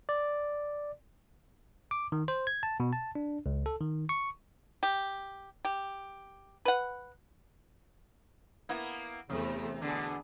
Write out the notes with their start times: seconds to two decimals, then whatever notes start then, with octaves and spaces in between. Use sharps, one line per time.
0.09 D5
1.91 D6
2.12 D#3
2.28 C5
2.47 G#6
2.63 A5
2.80 B2
2.93 A5
3.15 D4
3.46 C#2
3.66 A4
3.81 D#3
4.09 C#6
4.83 G4
5.65 G4
6.65 B4 F#5
8.69 A#3 B3 E4
9.30 E2 C3 A3
9.82 B2 D3 B3 D4 G#4